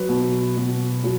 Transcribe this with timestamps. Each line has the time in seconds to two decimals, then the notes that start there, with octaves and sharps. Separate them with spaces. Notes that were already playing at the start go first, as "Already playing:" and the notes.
Already playing: F#3 B4
0.09 B2
0.57 B2
1.03 F#3